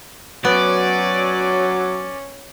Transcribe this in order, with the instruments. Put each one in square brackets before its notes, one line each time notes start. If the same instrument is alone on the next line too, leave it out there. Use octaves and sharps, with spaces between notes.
[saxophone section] F#3 [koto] B3 [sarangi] C#4 [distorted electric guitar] D5